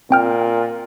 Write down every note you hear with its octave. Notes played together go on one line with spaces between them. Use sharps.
A#2 C4 G5 F6